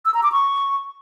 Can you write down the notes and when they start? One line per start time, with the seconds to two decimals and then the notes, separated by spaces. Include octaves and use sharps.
0.05 E6
0.14 A#5
0.23 D6
0.32 C#6